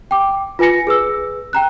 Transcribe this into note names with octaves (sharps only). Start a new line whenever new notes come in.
G5 D6
F4 B4 G#5 A#6 C#7
G#4 B4 E6
G5 A#5 F#6